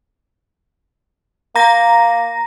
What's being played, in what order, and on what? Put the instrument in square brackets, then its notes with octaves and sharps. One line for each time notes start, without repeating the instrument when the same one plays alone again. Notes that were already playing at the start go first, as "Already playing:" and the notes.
[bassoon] A#3 [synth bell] A#5 A#6